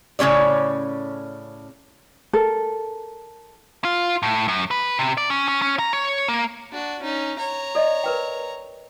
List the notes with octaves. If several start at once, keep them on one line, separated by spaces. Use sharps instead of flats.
A2 C#3 C#4 C#5 D5
A4 A#4
F4
A2
F#2
B4
C3
D5
C#4
C#4
C#4
A#5
C#5
A#3
D4 F#4
C#4 D#4
C#5 A#5
A4 D5 D#5
A#4 B4 G5